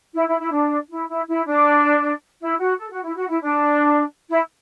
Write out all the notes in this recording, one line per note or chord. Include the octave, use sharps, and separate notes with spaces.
E4
E4
E4
D4
E4
E4
E4
D4
E4
F#4
A4
F#4
E4
F#4
E4
D4
E4